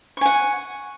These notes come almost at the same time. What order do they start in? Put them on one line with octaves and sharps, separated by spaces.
C#6 G#5 F#5